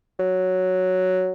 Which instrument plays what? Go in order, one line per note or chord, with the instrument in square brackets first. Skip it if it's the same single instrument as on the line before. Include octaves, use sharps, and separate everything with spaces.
[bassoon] F#3